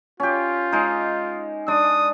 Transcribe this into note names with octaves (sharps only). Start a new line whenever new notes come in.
C#4 F4 G4
G#3 D#4
G#3 D4 D#6